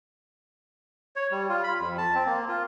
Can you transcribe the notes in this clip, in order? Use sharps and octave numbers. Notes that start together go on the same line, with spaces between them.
C#5
G3
F4
B5
F2
A5
C4
A#3
F4